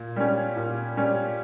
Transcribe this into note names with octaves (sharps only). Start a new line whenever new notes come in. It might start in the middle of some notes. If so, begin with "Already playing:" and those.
Already playing: A#2
G3 C#4
A#2
G3 C#4